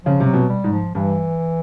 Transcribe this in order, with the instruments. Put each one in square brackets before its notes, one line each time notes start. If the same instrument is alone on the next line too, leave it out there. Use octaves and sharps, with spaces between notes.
[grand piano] C#3 [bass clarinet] F3
[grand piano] C3
[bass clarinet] F#3
[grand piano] B2
[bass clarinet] G3
[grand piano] G#2
[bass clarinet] F3
[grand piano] G2 [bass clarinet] E3